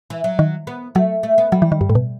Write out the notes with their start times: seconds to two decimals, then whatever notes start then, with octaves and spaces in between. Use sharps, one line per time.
0.10 E3
0.24 F#3
0.39 D#3
0.67 B3
0.95 F#3 A3
1.23 A3
1.38 B3
1.52 F#3 G3
1.62 E3
1.72 D#3
1.81 G2
1.89 A2
1.95 B2